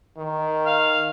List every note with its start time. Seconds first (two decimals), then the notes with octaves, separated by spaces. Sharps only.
0.18 D#3
0.66 F5